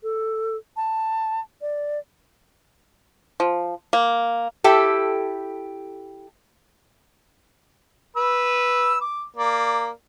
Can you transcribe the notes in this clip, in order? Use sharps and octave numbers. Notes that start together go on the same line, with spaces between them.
A4
A5
D5
F3
A#3
E4 G4 A4
B4 E6
D6
A#3 D5